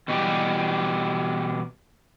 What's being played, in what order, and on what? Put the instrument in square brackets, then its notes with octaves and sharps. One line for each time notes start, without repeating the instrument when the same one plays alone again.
[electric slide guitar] B2 E3 G3 G4